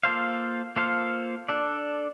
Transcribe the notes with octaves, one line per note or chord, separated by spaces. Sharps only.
A#3 F4 A4 C5 F5
A#3 F4 A4 C5 F5
D4 A4 D5